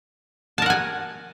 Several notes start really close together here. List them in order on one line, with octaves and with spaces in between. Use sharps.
A5 A#4 F#5 G#5